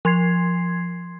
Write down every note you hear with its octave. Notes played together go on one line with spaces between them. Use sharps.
F3 C6 G#6 C7